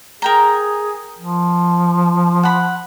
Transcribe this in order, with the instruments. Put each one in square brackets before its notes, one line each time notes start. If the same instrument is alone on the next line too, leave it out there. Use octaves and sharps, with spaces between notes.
[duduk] G#4 [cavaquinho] A#4 G5 A#5
[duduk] F3
[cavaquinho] F#5 B5